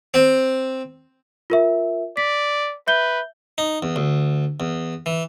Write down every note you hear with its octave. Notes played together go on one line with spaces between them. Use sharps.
C4
F4 A#4 E5
D5 B6
B4 E5 G6 G7
D#4
E2
D2
E2
E3